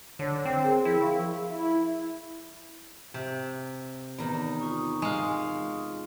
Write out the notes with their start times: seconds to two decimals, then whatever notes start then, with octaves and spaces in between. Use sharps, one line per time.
0.19 D3 C#5 A5
0.45 C4 G5
0.64 G#4 A#4
0.85 F3 E4 G#4
1.01 F5 C#6
1.49 E4
3.14 C3
4.18 E2 D#3 B3
4.59 F4 C#6 D#6
5.02 G#3 F5